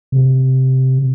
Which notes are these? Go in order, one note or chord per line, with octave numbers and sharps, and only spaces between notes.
C3